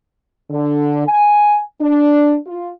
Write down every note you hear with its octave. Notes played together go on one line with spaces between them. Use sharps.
D3
G#5
D4
F4